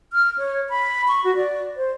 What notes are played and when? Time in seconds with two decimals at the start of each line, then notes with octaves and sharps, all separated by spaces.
0.13 F6
0.38 C#5
0.69 B5
1.08 C#6
1.24 F#4
1.36 D5
1.76 C5